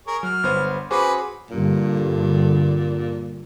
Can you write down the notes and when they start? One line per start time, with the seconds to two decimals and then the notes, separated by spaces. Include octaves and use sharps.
0.07 G#4 A#4 C#5
0.23 F#3 F6
0.43 G1 B3 C5
0.91 C#4 F#4 G#4 B4 C5 D6
1.51 G2 A#2 D3